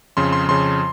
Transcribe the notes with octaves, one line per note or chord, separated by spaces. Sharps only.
F2 C#3 C6
C6
F2 C#3 C6